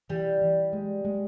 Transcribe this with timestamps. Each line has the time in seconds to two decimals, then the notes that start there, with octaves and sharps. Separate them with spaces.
0.10 E3 G3
0.41 E3
0.73 G#3
1.05 G#3